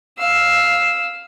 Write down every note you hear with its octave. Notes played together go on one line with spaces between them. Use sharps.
F5 E6